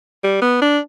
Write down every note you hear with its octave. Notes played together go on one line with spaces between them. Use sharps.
G3
B3
D4